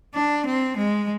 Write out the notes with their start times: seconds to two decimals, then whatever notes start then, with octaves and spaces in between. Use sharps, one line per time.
0.14 D4
0.46 C4
0.77 G#3